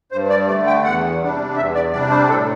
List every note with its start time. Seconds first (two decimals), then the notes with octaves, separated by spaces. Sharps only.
0.12 G2 C5
0.30 D5
0.48 A3 D5
0.52 D3
0.67 G5
0.84 E2 F#5
1.21 C3 G3 D4
1.56 E2 E5
1.75 D5
1.92 C3 G3 D4 D5
2.11 C5
2.28 A2 A4